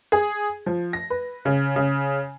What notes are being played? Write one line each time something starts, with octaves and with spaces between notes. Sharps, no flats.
G#4
F3
A#6
B4
C#3
C#3